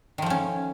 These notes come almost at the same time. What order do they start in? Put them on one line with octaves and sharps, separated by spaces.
D#3 F3 A3 C#4